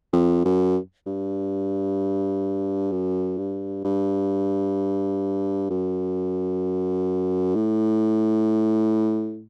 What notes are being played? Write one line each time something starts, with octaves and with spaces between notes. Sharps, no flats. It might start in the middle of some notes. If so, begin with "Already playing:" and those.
F2
F#2
G2
F#2
G2
G2
F#2
A2